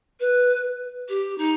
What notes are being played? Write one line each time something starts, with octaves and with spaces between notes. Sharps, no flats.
B4
G4
D#4